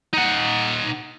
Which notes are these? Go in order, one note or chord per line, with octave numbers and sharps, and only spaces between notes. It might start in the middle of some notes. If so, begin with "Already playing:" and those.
D#4 F#5